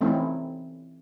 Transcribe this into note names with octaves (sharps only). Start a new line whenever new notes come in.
E3 A3 C4 C#4 D#4 E4